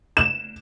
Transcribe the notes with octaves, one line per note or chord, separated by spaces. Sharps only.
E7